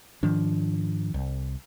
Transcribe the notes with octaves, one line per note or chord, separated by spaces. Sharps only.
G#2 D#3 F3 D4
C2